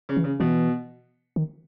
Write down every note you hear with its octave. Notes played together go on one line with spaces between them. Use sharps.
C#3
E3
C#3
B2 E3
D#3